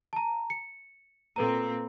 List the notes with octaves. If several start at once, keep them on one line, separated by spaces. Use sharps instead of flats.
A5 A#5
C#7
A#2 C4 A4 B4 A#5